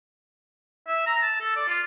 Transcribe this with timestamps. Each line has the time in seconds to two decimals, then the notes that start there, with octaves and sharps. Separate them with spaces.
0.88 E5
1.06 A#5
1.22 A5
1.40 A4
1.56 D5
1.68 F4